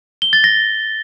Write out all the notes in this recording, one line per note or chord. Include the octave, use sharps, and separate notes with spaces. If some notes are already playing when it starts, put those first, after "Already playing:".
G7
A6
A#6